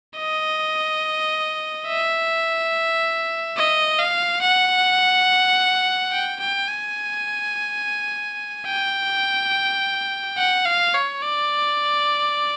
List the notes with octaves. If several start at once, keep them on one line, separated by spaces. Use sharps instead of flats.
D#5
E5
D#5
F5
F#5
G5
G5
G#5
G5
F#5
F5
C#5
D5